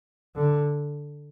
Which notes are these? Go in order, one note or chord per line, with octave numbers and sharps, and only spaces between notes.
D3